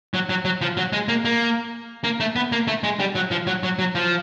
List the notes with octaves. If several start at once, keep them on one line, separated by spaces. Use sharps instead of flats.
F#3
F#3
F#3
F3
F#3
G#3
A#3
A#3
A#3
A3
B3
A#3
A3
G#3
G3
F#3
F3
F#3
F#3
F#3
F3